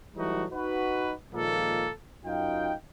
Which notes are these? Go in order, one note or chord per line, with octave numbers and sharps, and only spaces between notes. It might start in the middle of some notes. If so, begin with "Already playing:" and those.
E3 F#3 G3 A3 D#4 F#4
D#4 F#4 B4
A#2 D#3 F3 G#3 A#3 A4
F#2 D#4 F4 F5 G5